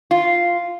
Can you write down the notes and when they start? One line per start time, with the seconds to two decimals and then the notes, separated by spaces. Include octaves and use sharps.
0.11 F4